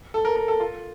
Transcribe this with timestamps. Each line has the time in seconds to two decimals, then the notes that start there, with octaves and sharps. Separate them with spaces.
0.14 A4
0.25 A#4
0.36 A#4
0.48 A4
0.60 F4